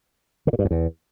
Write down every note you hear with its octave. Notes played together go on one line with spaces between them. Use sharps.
D3
A#2
G2
F2
E2